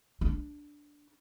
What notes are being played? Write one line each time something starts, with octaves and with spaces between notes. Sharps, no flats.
D4